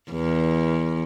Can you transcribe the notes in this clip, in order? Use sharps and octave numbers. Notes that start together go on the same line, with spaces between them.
E2